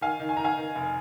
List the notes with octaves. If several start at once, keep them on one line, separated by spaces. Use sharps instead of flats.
D#3 F5 G#5
D#3
G#5
D#3 A#5
F5 G#5
D#3
F1